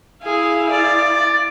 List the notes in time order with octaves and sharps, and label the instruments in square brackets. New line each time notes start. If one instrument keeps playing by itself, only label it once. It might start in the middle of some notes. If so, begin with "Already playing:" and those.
[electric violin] E4 F5 [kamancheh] G#4
[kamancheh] D5 [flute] A6